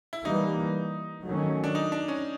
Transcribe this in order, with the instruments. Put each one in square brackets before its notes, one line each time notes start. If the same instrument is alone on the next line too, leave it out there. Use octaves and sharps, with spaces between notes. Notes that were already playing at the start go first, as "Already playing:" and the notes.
[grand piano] E4
[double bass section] E3 G3 A#3 [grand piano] D#4
[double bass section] D#3 F#3 A3 C#4
[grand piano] D4
D#4
D4
C#4